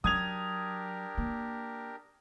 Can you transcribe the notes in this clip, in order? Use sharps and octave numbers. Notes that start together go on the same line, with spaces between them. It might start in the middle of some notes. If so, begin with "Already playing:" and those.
F#3 D4 G4 A#4 D#6 G#6 F7
A#3